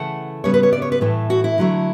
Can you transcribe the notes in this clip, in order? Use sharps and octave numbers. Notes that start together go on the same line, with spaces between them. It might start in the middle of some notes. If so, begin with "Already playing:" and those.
Already playing: C#3 E3 A3 F#5
C#3 G3 B3 C#5
B4
C#5
D5
C#5
B4
A2 E3 A3
F#4
E4
D3 F#3 A3